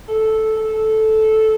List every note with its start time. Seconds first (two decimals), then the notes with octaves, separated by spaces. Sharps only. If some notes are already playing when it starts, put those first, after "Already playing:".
0.08 A4
0.57 A4